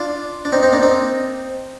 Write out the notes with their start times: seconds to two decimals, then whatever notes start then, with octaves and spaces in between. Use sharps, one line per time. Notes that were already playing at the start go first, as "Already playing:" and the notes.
Already playing: D4 F4
0.45 D4
0.52 C4 D#4
0.63 C4 D#4
0.73 A#3 D4
0.83 C4 D#4